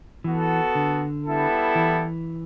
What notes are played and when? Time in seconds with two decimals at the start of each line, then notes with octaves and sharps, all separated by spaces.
0.24 E3 B3 F#4 A4
0.75 D3
1.25 G3 B3 E4 A4
1.75 E3